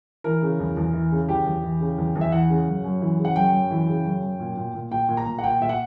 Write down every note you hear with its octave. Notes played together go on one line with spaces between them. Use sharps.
E3 A#4
C#3
E2
E2
E3
C#3
E2 G4
E2
E3
C#3
E2
E2
E5
E3 F#5
C#3
F#2
F#2
E3
C#3
F#5
F#2 G5
F#2
E3
C#3
F#2
F#2
A#2
A#2
A#2
A#2 G5
A#2
A#5
A#2
F#5
A#2 G5
A#2 E5
F#5